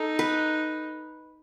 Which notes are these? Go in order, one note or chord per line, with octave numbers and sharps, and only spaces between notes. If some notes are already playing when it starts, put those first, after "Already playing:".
Already playing: D#4 A4
B4